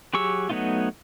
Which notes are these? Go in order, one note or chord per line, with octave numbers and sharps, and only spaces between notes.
F#3 G4 G#4 C#6 E6
F#3 A3 B3 D#4 F4